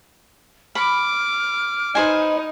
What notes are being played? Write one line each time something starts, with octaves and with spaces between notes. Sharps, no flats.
B5 D6 F6
D#4 B4 C5 G#5